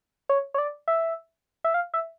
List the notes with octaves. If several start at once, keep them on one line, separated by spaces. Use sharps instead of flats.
C#5
C#5
D5
E5
E5
F5
E5